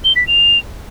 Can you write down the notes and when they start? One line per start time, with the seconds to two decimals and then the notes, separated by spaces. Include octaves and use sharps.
0.04 G7
0.16 B6
0.27 F7